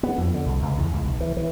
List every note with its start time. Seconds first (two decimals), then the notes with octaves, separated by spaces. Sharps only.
0.03 B3
0.18 F2
0.34 D3
0.46 C2
0.62 C#2
0.78 E2
0.93 C#2
1.05 B1
1.20 E3
1.37 E3